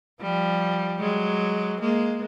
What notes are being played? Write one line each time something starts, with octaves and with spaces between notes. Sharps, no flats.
F3 G3
F#3 G#3
G#3 A#3